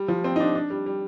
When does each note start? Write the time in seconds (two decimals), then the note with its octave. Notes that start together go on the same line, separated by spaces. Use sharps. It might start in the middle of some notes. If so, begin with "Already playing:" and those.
Already playing: G3
0.08 F3
0.24 C4
0.36 D#4
0.40 D4
0.55 D4
0.70 G3
0.86 G3